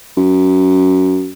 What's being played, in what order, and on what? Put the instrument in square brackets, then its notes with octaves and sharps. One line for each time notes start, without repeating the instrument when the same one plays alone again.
[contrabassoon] F#2